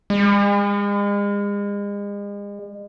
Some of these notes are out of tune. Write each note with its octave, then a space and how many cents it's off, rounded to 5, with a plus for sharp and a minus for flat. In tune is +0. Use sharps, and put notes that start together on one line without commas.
G#3 -40